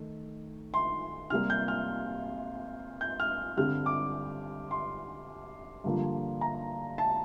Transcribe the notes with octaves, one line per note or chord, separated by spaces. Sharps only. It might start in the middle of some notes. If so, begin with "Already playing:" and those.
Already playing: D#3 A3
C6
C3 G3 A#3 F6
G6
F6
G6
F6
G2 D3 G3 C4 F6
D6
C6
G2 D3 F3 A#3
A#5
A5